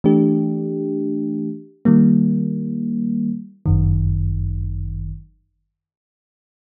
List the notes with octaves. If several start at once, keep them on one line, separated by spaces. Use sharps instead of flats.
E3 A3 D4 G4
D#3 G3 A#3
G1 F#2 D#3